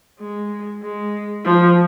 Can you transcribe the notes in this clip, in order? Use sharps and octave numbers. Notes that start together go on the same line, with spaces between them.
G#3
G#3
F3